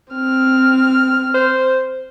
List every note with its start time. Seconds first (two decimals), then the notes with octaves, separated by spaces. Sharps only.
0.13 C4 F6
1.34 C5